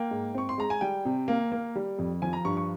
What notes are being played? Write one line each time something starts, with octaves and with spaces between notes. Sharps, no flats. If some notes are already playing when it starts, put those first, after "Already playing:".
Already playing: A#3 G5
G#2
C4 C#6
C6
G#3 A#5
G#5
G3 G5
C3
A#3
A#3
G3
F2
F3 G#5
A#5
G2 C#6
C#6